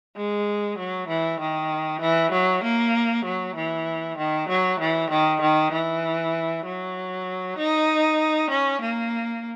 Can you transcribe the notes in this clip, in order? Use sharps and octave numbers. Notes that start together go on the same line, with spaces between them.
G#3
F#3
E3
D#3
E3
F#3
A#3
F#3
E3
D#3
F#3
E3
D#3
D#3
E3
F#3
D#4
C#4
A#3